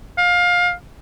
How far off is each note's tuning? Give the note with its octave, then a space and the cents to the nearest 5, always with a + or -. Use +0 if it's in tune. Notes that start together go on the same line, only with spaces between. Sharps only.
F5 +20